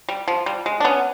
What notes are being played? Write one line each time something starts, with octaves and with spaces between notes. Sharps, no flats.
G3
F3
G3
G#3
D4
B3 C#4